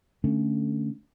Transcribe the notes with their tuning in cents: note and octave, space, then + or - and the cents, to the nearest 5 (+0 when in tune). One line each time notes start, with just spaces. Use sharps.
D3 +5 A3 +0 C#4 +0